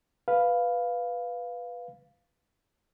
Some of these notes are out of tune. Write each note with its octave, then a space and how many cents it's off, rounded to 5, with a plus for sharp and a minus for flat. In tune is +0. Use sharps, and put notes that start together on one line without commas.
B4 +0 F5 +0